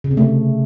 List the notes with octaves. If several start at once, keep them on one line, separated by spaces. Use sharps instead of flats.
C#3
C3
A3